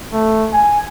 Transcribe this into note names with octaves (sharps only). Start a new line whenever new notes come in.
A3
G#5